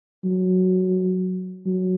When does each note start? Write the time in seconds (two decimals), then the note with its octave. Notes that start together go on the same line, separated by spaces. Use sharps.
0.24 F#3
1.67 F#3